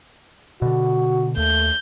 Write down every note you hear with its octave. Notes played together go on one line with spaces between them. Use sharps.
B2 D3 F#4
D#2 A3 G6